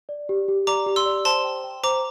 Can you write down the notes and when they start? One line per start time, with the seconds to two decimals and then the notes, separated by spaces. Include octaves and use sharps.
0.09 D5
0.29 G4
0.48 G4
0.67 D5 A#5 D6
0.86 G4
0.96 C6 E6
1.06 D5
1.25 C5 A5 C6
1.44 G5
1.64 G5
1.83 C5 A#5 D6